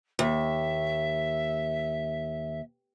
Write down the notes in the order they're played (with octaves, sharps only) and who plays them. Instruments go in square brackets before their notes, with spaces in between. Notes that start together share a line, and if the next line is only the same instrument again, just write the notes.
[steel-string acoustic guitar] D#2 [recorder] E5